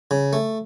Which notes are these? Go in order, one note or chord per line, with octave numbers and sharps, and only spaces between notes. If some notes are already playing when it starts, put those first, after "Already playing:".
C#3
A3